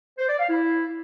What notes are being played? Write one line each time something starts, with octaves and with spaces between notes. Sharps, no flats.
C5
D5
F5
E4